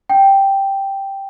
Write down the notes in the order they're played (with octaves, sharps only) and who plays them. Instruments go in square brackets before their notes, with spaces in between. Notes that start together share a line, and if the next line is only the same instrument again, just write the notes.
[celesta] G5